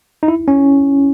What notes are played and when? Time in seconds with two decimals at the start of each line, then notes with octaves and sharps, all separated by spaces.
0.23 D#4
0.28 E4
0.48 C#4